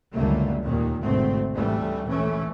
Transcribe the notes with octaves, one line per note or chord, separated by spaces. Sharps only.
C#2 F#2 D3 G3 A3 A#3
D#2 A#2 D#3
G#1 D2 B2 A3 C4
A1 D2 E3 G3 A3
A#1 E3 A3 C#4